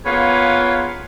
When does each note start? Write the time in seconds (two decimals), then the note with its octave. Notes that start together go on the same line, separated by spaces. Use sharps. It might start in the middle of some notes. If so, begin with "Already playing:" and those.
0.06 A#3 B3 C#4 F4 G#4 C#5